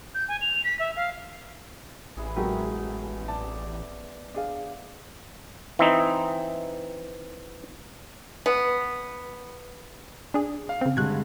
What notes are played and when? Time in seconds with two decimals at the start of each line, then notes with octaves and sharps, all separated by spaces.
0.15 G6
0.28 G#5
0.41 F7
0.64 B6
0.79 E5
0.96 F5
2.17 A1 E3 G#4
2.36 F#3 G#3 A3 B3 G4 G#4 A#4
3.28 D5 A5
4.34 D4 G#4 F5
5.79 E3 C4 D#4
8.46 B3
10.34 D4 G#4
10.69 F5
10.81 C#3 C4
10.97 G2 D3 G#3 F#6 G#6